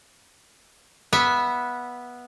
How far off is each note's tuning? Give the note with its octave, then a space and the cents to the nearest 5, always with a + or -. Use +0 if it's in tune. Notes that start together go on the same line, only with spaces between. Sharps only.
B3 -10 E5 +0